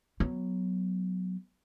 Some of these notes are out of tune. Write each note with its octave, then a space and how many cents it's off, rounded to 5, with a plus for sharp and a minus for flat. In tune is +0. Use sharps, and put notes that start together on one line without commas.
F#3 +0 B3 +0